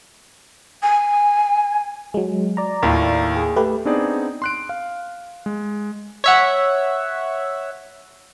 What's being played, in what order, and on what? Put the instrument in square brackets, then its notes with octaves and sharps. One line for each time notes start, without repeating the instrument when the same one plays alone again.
[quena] G#5
[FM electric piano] F#3 G#3
D5 A#5
[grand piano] D#2 A2 F4
[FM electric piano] G#4
A3 G4 B4
[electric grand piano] B3 C4 D4 D#4 G#4 D5
C6 F#6 D7
F5
G#3
[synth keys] C#5 E5 F#5